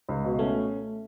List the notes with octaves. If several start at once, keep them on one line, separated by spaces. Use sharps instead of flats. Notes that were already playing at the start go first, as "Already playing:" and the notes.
C#2
B2
A3 C#4